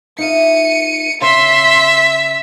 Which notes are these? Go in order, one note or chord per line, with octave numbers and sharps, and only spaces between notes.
D#4 F4 E5 C#7 D#7
C#3 E5 C6 B6